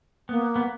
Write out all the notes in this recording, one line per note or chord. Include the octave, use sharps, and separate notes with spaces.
A#3 B3
B3